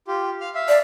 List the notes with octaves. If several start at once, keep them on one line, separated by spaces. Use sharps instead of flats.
F4 G4
F5 F6
E5 F5
D5